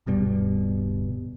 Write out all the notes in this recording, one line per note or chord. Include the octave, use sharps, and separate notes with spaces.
D1 G2 B2 G3